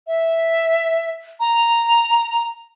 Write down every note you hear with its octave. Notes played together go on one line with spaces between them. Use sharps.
E5
A#5